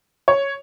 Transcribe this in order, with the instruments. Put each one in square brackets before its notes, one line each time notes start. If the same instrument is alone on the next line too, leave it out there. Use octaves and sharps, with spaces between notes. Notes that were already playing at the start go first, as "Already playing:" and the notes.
[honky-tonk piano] C#5